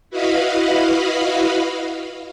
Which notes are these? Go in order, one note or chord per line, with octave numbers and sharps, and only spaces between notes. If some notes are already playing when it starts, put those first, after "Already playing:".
E4 F#4 B4 D#5 F5 B5